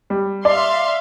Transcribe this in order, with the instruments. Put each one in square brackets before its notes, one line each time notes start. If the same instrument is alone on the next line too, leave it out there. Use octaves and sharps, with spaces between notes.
[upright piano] G3
[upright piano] D5 [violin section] E5 F5 C6